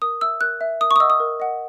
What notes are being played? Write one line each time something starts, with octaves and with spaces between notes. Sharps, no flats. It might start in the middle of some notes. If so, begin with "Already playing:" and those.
A#4 D#6
E5 E6
A#4 F#6
E5
A#4 D#6
C#6
D#6
D#5 F#5 E6
D#6
A#4
D#5 F#5